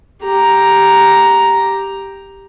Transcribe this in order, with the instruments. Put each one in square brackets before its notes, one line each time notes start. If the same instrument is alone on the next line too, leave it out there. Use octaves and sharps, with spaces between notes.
[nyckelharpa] G4 A#5